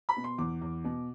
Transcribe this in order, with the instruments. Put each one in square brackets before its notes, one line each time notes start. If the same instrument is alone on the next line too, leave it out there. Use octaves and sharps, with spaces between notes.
[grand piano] B5
B2
C6
E2 D6
E2
B2